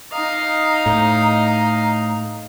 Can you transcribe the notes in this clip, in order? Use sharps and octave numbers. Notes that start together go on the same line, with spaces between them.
D#4 D#5 F5 A#5
A2